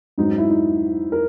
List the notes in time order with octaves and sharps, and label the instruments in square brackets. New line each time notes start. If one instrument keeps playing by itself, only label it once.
[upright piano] G#2 F#3 C#4 D#4
E4
D#4
A#4